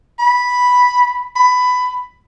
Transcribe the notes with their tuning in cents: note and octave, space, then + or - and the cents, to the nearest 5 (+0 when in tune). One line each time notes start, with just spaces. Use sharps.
B5 -5
B5 +15